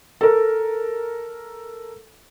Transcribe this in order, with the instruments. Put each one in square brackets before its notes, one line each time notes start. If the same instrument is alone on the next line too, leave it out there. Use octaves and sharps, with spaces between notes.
[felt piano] A4 A#4